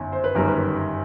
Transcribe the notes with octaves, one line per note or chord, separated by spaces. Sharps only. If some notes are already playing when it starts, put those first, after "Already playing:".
Already playing: G1 F#2 D#3
C5
B4
G1 F#2 D#3 G3 A#4
B4